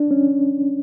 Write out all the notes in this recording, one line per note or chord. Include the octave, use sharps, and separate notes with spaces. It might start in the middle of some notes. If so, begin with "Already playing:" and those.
Already playing: D4
C#4